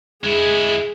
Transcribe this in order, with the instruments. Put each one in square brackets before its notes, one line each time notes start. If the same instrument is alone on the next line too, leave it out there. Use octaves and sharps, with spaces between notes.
[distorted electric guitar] G#3 E4 [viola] G#4